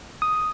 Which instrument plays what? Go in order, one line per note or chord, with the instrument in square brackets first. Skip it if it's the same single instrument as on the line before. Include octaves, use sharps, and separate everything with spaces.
[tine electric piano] D#6